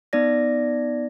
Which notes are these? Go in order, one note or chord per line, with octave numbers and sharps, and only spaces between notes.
B3 D#4 D5 A#6